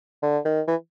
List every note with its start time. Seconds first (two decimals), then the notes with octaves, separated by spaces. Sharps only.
0.22 D3
0.45 D#3
0.67 E3